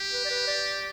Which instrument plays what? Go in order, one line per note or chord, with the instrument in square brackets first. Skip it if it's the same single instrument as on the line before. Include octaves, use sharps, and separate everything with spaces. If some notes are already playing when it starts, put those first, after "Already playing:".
Already playing: [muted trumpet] G4
[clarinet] B4
D5
B4
D5